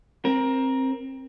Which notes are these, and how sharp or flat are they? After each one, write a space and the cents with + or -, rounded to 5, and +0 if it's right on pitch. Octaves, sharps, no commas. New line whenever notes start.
C4 +15 A#4 +15